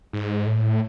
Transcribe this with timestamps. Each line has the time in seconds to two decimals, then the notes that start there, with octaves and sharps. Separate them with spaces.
0.13 G#2
0.47 A2